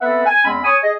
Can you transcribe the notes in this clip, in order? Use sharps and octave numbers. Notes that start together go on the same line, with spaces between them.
B3 C4 A4 B4 E5 F#5
G#5
E2 G#3 C4 C#4 B5
C#5 G#5 C#6 D#6
G#4 D#5